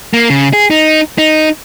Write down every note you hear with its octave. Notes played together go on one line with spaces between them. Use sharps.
A#3
C#3
G#4
D#4
D#4